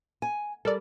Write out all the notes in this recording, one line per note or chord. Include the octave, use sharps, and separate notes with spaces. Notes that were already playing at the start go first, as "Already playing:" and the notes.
G#5
G3 A4 A#4 D5